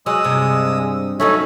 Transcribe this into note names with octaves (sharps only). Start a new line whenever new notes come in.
F#3 G#3 D#6 E6
G2 C3
F#3 A3 C#4 D#4 C#5 E5